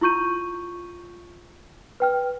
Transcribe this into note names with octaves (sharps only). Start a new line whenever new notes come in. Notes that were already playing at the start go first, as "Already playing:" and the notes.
E4 F4 C#6 G6 D#7
B4 G5 F6